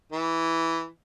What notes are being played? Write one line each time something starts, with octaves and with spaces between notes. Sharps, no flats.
E3